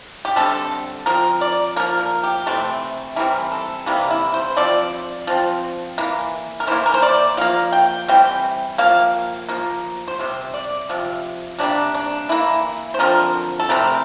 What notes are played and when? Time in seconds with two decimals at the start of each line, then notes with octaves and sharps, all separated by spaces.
0.25 G4
0.36 D3 G3 C4 A4
1.06 F3 C4 A#4
1.41 D5
1.76 F3 A#3 A#4
2.00 A#4
2.23 G4
2.47 C3 E3 A3 C4
3.16 E3 G3 C4 A#4
3.52 A4
3.86 C3 E3 G3 A#3
4.11 E4
4.34 C5
4.57 F3 C4 D5
5.27 F3 C4
5.98 E3 A#3
6.60 A#4
6.67 E3 A#3 C5
6.86 A#4
6.94 C5
7.02 D5
7.37 F3 A#3 F5
7.72 G5
8.08 E3 G3 C4 G5
8.78 F3 A#3 F5
9.49 F3 A#3
10.08 C5
10.19 C3 G3
10.54 D5
10.89 C3 F3
11.59 C3 G3 A#3 D4
11.95 D4
12.29 E3 A#3 E4
12.94 C5
12.99 D3 F3 C4 A#4
13.60 A4
13.69 C3 E3 A3 C4 A#4